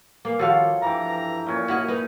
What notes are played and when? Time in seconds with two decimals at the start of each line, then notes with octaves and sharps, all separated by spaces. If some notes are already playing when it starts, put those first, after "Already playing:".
0.25 E3 A#3
0.39 D#3 F3 F#4 G4 A4 C#5 F5
0.82 G2 E3 G4 A#5 D6
1.46 A#2 C#4
1.68 G2 E4 F#4 A#4 D#5
1.88 D#4 B4